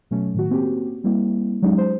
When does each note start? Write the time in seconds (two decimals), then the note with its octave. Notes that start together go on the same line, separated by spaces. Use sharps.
0.11 B2 F#3 A3 C#4
0.34 A2 D#3 F#4
0.50 A#3 C4 C#4 F#4 G4
1.04 G3 A#3 C4 E4
1.62 F#3 G#3 C#4 D#4 G4
1.78 C5